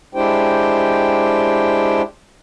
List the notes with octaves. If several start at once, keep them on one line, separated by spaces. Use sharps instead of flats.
G#3 D4 E4 G4 C5 G5